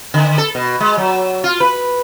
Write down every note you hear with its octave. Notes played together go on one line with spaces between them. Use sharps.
D3
A4
B2
G#3
F#3
F4
B4